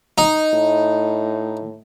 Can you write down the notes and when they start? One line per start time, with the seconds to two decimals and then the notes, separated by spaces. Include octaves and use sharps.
0.18 D#4
0.54 A2